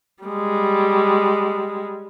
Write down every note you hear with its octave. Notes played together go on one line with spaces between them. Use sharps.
G3 G#3